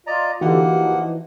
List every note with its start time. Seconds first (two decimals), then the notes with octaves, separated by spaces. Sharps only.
0.07 F4 D5 D#5 A#5
0.41 D3 E3 A#3 D#4 F#4 G4 F#5
0.71 F3